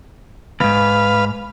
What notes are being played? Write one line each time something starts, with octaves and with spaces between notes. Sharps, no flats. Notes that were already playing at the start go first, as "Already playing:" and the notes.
D#2 G#2 B4 F5